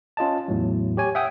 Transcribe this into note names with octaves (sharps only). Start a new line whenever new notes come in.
C#4 F4 D#5 A5
E2 A2 F#3
G4 C#5 G#5
E5 F#5 G5 D#6